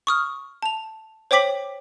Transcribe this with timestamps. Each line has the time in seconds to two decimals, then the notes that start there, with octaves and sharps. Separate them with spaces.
0.07 C#6 D#6 F6
0.62 A5 F7
1.31 C5 C#5 G5 D6 B6 F#7